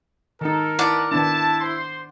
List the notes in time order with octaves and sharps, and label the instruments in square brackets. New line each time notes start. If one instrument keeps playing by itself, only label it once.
[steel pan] D#3 D#4 [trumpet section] A4 [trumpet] A#4
[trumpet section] B3 A5 [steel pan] E4 [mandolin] D5 F#5
[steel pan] D#3 B3 D4 [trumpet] E4 [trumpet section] A5
[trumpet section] C5 C6